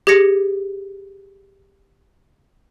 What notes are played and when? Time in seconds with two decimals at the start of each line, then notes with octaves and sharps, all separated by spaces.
0.07 G4 G#4 G#6 A#6 C#7